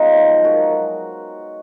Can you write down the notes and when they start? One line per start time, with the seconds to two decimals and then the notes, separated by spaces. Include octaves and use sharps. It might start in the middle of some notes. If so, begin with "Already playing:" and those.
Already playing: G#2 F#3 B3 D#4 F4 G#4
0.17 F3
0.44 F#3 F#4 A#4
0.72 F#3